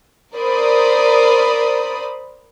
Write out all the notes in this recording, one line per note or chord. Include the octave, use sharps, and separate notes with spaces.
A#4 C5 D5 B5 D#6